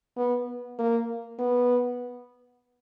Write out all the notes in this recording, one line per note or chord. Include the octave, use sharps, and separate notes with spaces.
B3
A#3
B3